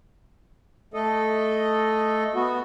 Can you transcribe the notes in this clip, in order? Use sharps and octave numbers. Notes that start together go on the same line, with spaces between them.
A3 A4 D#5
B3 F#4